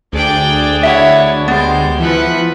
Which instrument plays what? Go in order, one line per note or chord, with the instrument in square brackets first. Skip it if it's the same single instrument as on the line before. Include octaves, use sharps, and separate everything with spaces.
[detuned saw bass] D2 [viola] D4 G#4 [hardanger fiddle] D5 G5
[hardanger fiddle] E4 C#5 [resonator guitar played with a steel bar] E5 F#5
[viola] G#3 [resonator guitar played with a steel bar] B3 [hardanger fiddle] G4 C5
[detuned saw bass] E3 [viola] F3 B4 [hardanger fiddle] E5 F#5